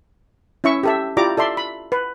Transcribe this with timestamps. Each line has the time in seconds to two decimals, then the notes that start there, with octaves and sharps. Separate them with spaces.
0.64 C#4 E4 E5 C#6
0.83 G4 A4 E5
1.17 E4 F4 G4 D5 A#5 D6
1.37 A4 D5 E5 C6
1.57 B5
1.92 B4